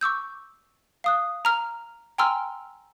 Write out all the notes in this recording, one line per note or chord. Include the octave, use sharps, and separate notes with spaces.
C#6 D6 E6 G6
F5 D#6 F#6
A#5 F6
G5 G#5 A#5 C6 E6 F6